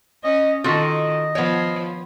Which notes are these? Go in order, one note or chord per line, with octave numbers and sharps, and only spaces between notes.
C#4 D#5
D#3 F4 F#4 A4 D#5
F3 B3 C#5